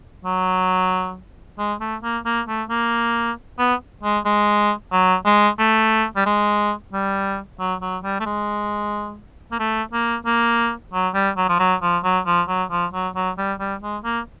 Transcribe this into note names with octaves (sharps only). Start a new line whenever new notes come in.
F#3
G#3
A3
A#3
A#3
A3
A#3
B3
G#3
G#3
F#3
G#3
A3
G3
G#3
G3
F#3
F#3
G3
A3
G#3
A#3
A3
A#3
A#3
F#3
G3
F#3
F3
F#3
F3
F#3
F3
F#3
F3
F#3
F#3
G3
G3
G#3
A#3